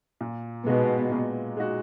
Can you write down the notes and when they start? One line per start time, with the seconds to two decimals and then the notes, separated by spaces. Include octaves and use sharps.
0.21 A#2
0.66 B2 G#3 D#4 F#4
1.12 A#2
1.57 G#3 D#4 F#4